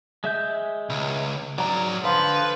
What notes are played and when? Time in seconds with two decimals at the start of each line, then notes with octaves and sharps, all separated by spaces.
0.24 G#3 E5 G6
0.89 C#2
1.58 G#2 F#3 D5 A#5
2.05 D3 F3 B4 F5